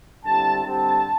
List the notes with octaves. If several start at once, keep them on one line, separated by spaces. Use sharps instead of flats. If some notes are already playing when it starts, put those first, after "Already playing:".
D3 G3 C4 E4 A5
D3 G3 C4 A5